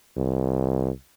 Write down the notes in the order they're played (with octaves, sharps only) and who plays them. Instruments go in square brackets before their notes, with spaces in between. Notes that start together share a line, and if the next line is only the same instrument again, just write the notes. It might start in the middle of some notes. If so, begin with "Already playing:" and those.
[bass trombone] C2